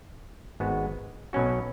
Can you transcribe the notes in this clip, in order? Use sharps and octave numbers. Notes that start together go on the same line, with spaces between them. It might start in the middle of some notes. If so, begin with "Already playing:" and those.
G#1 G#2 G#3 B3 F#4
B1 B2 F#3 C#4 F#4